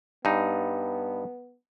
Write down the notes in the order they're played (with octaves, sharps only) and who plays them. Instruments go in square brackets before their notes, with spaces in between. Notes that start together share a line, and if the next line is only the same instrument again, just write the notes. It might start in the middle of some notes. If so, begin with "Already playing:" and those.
[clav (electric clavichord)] G2 D#4 [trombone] B3